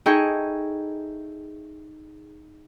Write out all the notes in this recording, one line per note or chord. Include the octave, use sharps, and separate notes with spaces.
D#4 E4 G#4 A4 G5 C#6